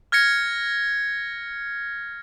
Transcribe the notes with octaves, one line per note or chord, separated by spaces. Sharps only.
F6 G#6 A#6 C#7